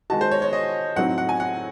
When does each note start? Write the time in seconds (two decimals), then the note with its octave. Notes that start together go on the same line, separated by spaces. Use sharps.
0.10 D#3 G#3 D#4 F#4 A5
0.21 C5
0.31 C#5
0.42 C#5
0.53 D#5
0.96 A2 F#3 C4 D#4 F#5
1.18 F#5
1.29 G#5
1.40 F#5